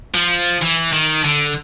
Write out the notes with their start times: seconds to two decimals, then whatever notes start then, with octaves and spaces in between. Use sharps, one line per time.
0.15 F3
0.62 E3
0.93 D#3
1.24 D3